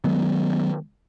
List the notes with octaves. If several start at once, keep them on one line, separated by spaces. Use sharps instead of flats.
D#3 F#3 G#3 B3